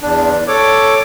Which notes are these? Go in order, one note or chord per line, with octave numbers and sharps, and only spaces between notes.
E2 D4
A4 C#5 D6